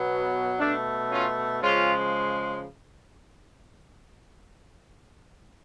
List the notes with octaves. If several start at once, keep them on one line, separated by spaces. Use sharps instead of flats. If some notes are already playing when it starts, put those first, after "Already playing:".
Already playing: B2 F#3 B3
B2 A3 D4
C#4 F4
C#3 F3 G#3 C#4 F4